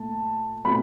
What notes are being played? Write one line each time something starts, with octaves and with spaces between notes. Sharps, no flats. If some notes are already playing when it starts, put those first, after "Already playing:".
Already playing: A#2 A3 A5
B2 F#3 A3 C4 B5